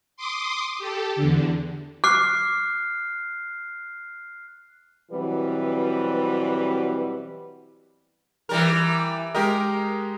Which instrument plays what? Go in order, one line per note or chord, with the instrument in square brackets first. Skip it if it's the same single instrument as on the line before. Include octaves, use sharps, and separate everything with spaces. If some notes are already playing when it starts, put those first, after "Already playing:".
[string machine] C6 D6 D#6
G4 A4
E2 D3
[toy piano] D6 [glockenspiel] F6 F#6 C7
[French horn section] B2 E3 F#3 G3 C4 B4
[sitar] E3 G3 A#4
[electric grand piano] G#3 G4 D#5 [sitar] A#4